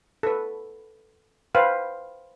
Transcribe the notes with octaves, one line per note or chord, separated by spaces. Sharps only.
A4 B4
B4 C5 F5 G5